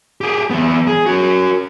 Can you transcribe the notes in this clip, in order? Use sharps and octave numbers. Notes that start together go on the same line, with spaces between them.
G4 G#4
E3 B3
G#4
C#4 F#4